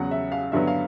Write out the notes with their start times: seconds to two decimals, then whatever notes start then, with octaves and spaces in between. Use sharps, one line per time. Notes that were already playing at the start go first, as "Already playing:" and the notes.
Already playing: E2 C#3 F#3 F#5
0.11 E5
0.32 F5
0.52 G2 D3 F#3 B3 E5
0.67 F5